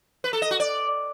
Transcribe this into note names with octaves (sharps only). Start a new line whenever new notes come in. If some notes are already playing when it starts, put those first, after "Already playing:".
B4
A4
D#5
F#4
D5